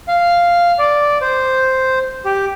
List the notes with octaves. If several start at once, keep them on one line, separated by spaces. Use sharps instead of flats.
F5
D5
C5
G4